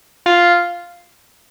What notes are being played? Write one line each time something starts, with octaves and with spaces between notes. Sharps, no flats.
F4